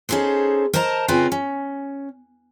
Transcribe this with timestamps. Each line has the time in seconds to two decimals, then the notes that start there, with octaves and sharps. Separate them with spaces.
0.09 C#4 D#4 G#4 A4 C5
0.73 A#4 C5 D#5 A5 A#5
1.08 C#3 C4 D#4 F4 B4 G#5
1.32 C#4